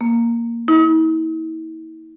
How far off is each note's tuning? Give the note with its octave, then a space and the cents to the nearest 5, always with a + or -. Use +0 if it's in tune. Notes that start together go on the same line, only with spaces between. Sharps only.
A#3 +0
E4 -45